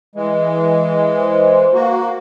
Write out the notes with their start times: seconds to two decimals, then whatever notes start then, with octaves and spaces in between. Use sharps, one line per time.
0.15 E3 G#3
1.19 C5
1.74 A#3 F#4